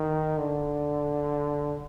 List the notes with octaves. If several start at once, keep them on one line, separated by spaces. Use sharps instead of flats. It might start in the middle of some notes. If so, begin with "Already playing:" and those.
Already playing: D#3
D3